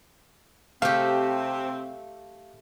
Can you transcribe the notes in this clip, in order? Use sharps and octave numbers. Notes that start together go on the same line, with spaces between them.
C3 A3 C4 G4 F5